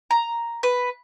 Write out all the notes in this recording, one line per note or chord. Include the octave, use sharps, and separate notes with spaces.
A#5
B4